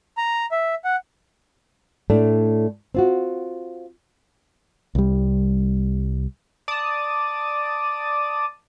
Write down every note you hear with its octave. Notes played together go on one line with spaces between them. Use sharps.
A#5
E5
F#5
A2 A3 D4
C4 F4 F#4
C2 G3
D5 A5 D#6